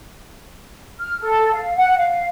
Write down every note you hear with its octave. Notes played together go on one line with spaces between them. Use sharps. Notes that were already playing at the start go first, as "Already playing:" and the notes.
F6
A4
F5
F#5
F5